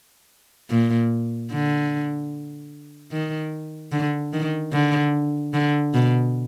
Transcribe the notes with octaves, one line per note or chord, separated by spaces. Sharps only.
A#2
D3
D#3
D3
D#3
D3
D3
B2